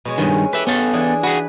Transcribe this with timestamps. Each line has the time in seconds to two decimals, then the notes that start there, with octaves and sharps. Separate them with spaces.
0.05 B2 G#3 C#5
0.18 G2 D#3 C#4 B4
0.53 G4 A4 B4 E5
0.67 B3 C#4 A4 F5
0.93 E3 D4 G#4
1.23 F#4 G#4 B4